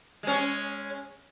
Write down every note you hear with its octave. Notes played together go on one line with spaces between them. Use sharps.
G#3 C#4